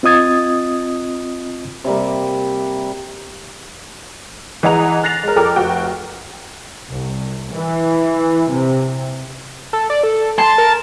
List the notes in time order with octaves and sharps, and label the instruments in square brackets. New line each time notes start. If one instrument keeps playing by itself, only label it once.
[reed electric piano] C4 F4 D#5 D#6 G#6 A6
[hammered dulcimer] C3 G3 A#3
[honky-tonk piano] E3 G#3 D#5 F#5 A#5 F7
F#6 A6 A#6 C7 F7
G#3 A#4
F2 A4 A#4 G5 D6
F1 F#4 G5
[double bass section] C2
E3
C3
[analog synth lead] A4
D5
A4
[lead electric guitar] A5 [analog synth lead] C6
[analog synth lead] A#4